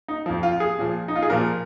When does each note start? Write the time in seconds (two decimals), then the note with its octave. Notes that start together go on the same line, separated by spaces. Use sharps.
0.08 D#4
0.26 F2 F3
0.43 F4
0.60 G#4
0.78 A#2 F3
1.08 D#4
1.15 F4
1.22 G#4
1.30 A#2 F3 A#4